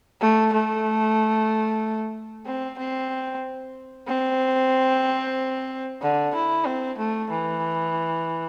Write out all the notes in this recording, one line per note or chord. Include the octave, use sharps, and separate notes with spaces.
A3
A3
C4
C4
C4
D3
E4
C4
A3
E3